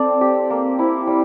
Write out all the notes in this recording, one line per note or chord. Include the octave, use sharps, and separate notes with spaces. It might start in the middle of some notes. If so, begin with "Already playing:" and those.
Already playing: C4 A4 D5
G4
A#3
E4
G3